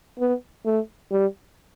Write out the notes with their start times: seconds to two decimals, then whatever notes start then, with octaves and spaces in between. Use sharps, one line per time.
0.19 B3
0.65 A3
1.11 G3